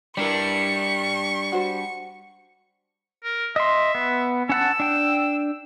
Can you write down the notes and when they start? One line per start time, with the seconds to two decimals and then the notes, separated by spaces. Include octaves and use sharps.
0.17 G3 D4 E4 A#4 D5 C#6
1.52 F#4 C5
3.24 A#4
3.56 D#5 E5 C6
3.95 B3
4.49 C#4 F#5 A5 E6
4.80 D4 G5